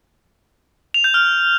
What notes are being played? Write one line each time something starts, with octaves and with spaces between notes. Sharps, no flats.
F7
G6
F6